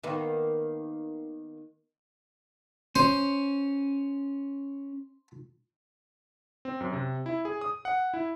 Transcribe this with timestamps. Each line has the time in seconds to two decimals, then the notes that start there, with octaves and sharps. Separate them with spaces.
0.03 D#3 A#3 B3
2.96 C#4 C5
6.65 C4
6.81 F#2
6.92 C3
7.26 E4
7.45 G#4
7.61 D#6
7.85 F#5
8.14 E4